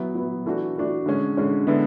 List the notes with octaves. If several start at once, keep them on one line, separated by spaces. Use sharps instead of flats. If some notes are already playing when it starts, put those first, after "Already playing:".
Already playing: F#3 B3 E4
F#3 B3 E4
E3 A3 D4 F#4
E3 A3 D4 F#4
D3 G#3 C#4
D3 G#3 C#4
D3 G#3 B3 E4